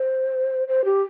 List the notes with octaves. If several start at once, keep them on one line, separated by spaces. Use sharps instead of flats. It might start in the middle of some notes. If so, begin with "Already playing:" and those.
Already playing: C5
C5
G4